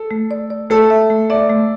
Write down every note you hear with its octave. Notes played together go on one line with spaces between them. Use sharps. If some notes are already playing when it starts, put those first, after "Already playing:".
Already playing: A4
A3
D5
D5
A3 A4
E5
A3
D5 E5
A3